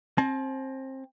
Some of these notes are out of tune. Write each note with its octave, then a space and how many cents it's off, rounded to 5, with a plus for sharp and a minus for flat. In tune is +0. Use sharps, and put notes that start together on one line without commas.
C4 +25 A5 -40